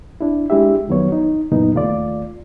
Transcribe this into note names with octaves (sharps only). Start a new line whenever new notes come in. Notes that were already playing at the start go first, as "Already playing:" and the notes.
D4 E4
G#3 D4 E4 G4 E5
F2 D#3 F#3 B3 C#5
D#4
F#2 A#2 C#3 E3 B3 D#4
D#2 A3 F4 D5